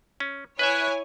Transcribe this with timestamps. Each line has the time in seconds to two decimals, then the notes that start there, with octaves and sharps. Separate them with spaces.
0.20 C#4
0.59 E4 B4 C#5 E5 G#5 F#6